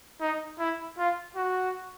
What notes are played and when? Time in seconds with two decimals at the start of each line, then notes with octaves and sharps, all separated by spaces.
0.21 D#4
0.59 E4
0.98 F4
1.36 F#4